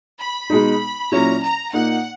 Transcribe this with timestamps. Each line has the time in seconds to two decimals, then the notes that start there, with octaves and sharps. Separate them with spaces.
0.19 B5
0.50 B2 G#3 D#4
1.11 A#2 F#3 C#4 E4 A#5
1.42 A#5
1.73 A#2 A#3 D#4 F#5